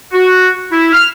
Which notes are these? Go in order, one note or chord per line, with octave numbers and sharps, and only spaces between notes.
F#4
E4
F6